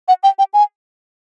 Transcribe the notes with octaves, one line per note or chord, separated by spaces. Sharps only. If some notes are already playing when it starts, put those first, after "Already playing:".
F#5
G5
G5
G#5